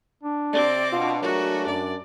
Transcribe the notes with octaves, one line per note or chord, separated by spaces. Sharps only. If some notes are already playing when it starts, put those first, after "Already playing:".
D4
C3 C4 D5 D6
B2 D4 F4
F#3 G#3 A3 F#4 A#4
F#2 D5